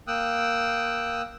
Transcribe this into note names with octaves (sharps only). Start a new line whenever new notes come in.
A#3 G5 D#6 E6 F#6